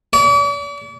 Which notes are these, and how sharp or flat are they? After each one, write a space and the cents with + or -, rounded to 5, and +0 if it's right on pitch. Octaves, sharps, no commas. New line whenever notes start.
D5 -45